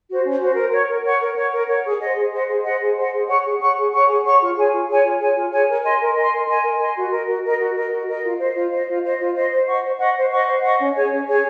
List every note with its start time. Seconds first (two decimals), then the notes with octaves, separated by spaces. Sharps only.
0.09 F#4 C5
0.25 C#4
0.40 F#4 C5
0.56 A#4
0.72 C#5 F#5 C#6
0.88 A#4
1.04 C#5 F#5 C#6
1.20 A#4
1.36 C#5 F#5 C#6
1.53 A#4
1.68 C#5 F#5 C#6
1.84 G#4
2.00 C5 D#5 F#5
2.16 G#4
2.32 C5 D#5 F#5
2.48 G#4
2.64 C5 D#5 F#5
2.80 G#4
2.96 C5 D#5 F#5
3.13 G#4
3.28 C#5 F#5 C#6
3.44 G#4
3.60 C#5 F#5 C#6
3.77 G#4
3.92 C#5 F#5 C#6
4.07 G#4
4.25 C#5 F#5 C#6
4.40 F4
4.56 G#4 C#5 G#5
4.71 F4
4.88 G#4 C#5 G#5
5.04 F4
5.20 G#4 C#5 G#5
5.36 F4
5.52 G#4 C#5 G#5
5.68 A#4
5.83 D#5 G#5 C6
6.00 A#4
6.16 D#5 G#5 C6
6.32 A#4
6.48 D#5 G#5 C6
6.64 A#4
6.80 D#5 G#5 C6
6.96 F#4
7.12 A#4 D#5
7.28 F#4
7.44 A#4 D#5
7.59 F#4
7.76 A#4 D#5
7.92 F#4
8.07 A#4 D#5
8.24 F4
8.39 C5 D#5
8.56 F4
8.72 C5 D#5
8.88 F4
9.03 C5 D#5
9.19 F4
9.36 C5 D#5
9.51 C5
9.67 D#5 F#5 C#6
9.83 C5
9.99 D#5 F#5 C#6
10.16 C5
10.31 D#5 F#5 C#6
10.48 C5
10.63 D#5 F#5 C#6
10.79 C#4
10.95 G#4 C#5 G#5
11.11 C#4
11.27 G#4 C#5 G#5